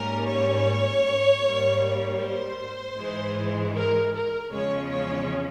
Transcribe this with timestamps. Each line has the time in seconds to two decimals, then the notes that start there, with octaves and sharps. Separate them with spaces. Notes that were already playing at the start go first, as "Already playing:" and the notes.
Already playing: G#2 G3 A#3 C#4 A#4
0.27 C#5
1.42 G#2 G3 A#3
2.20 C5
2.97 G#2 E3 G#3
3.75 A#4
4.13 A#4
4.51 E2 C#3 F3 G#3 C#4 C#5
4.90 C#5